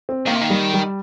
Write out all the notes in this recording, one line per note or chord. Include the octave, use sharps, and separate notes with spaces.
C4
D#3 A#3
C3
D#3
G3
G3